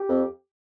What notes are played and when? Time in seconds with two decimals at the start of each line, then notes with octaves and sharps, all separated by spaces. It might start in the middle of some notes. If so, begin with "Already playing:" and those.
Already playing: G4
0.08 F2